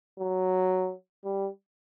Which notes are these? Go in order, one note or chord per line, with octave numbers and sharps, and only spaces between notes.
F#3
G3